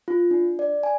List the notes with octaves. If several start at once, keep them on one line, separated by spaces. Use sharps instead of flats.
F4
D4
D5
G#5